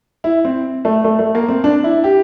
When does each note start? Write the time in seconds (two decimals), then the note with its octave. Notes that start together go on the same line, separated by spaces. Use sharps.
0.24 E4
0.45 C4
0.85 A3
1.04 A3
1.19 A3
1.35 A#3
1.48 C4
1.64 D4
1.84 E4
2.04 G4